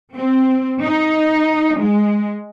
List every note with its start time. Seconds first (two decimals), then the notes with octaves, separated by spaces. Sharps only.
0.16 C4
0.83 D#4
1.80 G#3